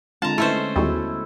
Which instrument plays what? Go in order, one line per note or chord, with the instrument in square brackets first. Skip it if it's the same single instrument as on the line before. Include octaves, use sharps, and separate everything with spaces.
[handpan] D3 G#3 [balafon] C4 D4 [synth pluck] F4 [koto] A5 A#5
[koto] A3 C#4 C5 [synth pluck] E4 [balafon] B4 E5
[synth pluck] D#2 G3 G#3 [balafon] B3 F#4 C#6 [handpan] E4 A4